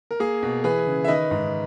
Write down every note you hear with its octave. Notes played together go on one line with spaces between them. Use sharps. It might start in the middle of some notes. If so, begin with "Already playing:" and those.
A#4
A#3 G#4
B2
E3 G#4 B4
C#3
E5
D#3 B4 D#5
G#2